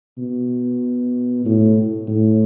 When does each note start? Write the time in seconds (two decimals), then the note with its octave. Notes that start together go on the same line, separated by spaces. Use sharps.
0.18 B2
1.45 A2
2.08 A2